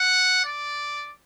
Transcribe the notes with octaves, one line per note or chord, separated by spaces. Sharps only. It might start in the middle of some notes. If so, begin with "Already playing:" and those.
Already playing: F#5
D5